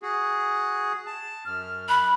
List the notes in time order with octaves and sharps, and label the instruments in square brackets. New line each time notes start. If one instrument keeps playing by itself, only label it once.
[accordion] F#4 G#4
A5
[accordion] F#2 [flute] F6
[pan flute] B5 [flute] F#6